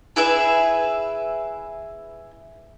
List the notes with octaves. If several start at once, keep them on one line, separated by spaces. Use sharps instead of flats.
E4 G#4 B4 E5